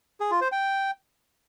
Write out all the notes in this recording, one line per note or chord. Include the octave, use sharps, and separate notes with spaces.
G#4
F4
C5
G5